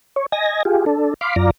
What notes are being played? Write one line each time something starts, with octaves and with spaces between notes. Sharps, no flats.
C#5
D#5 G#5 A#6
F4 G4 G#4
D4 A4
F5 B5 C6 D6
F#2 F4 D5 A#5